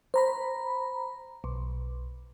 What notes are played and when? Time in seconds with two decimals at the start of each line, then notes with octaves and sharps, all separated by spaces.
0.14 C5 A#5 B5
1.44 B1